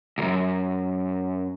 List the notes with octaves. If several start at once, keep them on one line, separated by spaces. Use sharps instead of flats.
C2 F#2